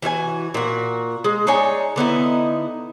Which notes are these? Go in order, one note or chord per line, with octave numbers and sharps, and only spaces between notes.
E3 F#4 E5 G#5
A#2 F#4
G#3
D4 D#4 C#5 G#5
D3 B3 D#4 E4